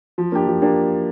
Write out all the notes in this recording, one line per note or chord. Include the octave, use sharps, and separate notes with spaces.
F3
A#3 D4 G4
F3
A#3 D4 G4